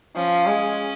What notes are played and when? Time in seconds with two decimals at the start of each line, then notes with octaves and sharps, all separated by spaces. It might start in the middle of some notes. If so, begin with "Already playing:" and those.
0.15 F3 C#4
0.46 G#3